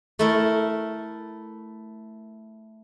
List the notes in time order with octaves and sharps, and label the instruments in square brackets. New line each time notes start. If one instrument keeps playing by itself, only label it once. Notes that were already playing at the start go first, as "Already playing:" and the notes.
[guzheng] A3 E4 A#4